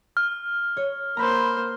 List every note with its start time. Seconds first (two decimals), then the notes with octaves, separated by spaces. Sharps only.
0.17 F6
0.77 C#5
1.17 A#3 C5 A#5 B5 E6